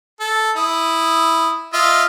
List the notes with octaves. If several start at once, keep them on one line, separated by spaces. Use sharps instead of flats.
A4
E4 D#6
F4 D#5 E5